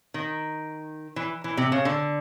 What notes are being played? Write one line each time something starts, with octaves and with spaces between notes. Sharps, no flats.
D#3
E3
E3
C3
C#3
D3